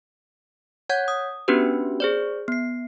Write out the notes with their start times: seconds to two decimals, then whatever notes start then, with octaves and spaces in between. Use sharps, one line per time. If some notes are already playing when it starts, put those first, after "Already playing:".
0.90 C#5 F#5 G6 G#6
1.08 D#6
1.48 B3 C#4 D4 F#4 G4 B4
2.00 G#4 C5 D5
2.48 B3 C7